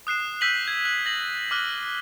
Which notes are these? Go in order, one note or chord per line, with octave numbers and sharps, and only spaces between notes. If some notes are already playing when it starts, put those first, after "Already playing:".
D#6 F#6 C7 E7
E6 G6 B6 D#7 F#7
G#6
F#6 F#7
A#6 F#7
D6 F6 F#6 G7